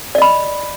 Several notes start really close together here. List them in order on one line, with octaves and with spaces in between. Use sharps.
D5 D#5 B5